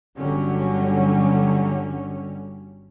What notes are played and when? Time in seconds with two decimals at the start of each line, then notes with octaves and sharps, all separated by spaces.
0.16 G1 D3 F#3 G3 C#4